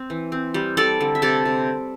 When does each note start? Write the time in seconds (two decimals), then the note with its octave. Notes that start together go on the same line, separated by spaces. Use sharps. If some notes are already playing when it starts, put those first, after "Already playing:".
Already playing: C4
0.10 E3
0.32 C4
0.54 G3
0.77 G3 A4 D5
1.01 D3
1.15 E5
1.22 C3 A4 D5
1.45 C3